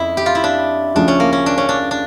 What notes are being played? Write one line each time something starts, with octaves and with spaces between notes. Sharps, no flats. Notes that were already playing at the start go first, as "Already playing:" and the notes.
Already playing: F2 C#3 E4
G4
F4
E4
D4
D2 C#3 F3 D4
C#4
A#3
C#4
D4
C#4
D4
D4